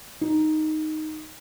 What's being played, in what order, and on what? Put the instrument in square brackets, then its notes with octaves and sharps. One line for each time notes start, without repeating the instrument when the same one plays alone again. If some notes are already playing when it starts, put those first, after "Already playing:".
[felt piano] D#4